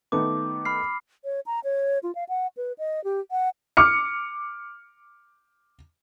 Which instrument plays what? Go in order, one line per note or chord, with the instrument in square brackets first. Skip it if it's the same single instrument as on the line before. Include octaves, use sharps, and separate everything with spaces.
[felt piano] D#3 A3 B3 [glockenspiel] D6
[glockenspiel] B5 F6 C7
[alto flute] C#5
A#5
C#5
F4
F5
F#5
B4
D#5
G4
F#5
[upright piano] D6 F6 C#7